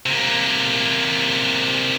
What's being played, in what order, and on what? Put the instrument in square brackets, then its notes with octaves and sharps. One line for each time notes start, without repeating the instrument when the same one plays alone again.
[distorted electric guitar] C3 A#3